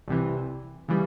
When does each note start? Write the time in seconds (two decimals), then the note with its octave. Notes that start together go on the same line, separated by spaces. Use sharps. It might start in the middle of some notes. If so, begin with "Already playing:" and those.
0.08 C2 C3 E3
0.88 C#3 E3 G3